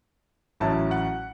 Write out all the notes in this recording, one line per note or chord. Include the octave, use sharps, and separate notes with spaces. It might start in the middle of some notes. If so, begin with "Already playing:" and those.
A1 A2 F#3 C#4 E4 A5
F#5